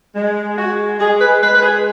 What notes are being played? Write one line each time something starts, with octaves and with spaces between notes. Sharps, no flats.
G#3
G#3 F#4
G#3 G#4
B4
G#3 B4
B4
G#4